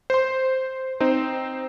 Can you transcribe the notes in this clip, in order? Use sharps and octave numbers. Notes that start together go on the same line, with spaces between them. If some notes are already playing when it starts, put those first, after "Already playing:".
C5 C6
C4 D#4 C5